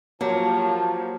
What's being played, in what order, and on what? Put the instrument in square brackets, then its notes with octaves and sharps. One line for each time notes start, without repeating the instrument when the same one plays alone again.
[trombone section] F3 [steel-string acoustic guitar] F#3 [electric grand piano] A#3 G4 C#5 [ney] A5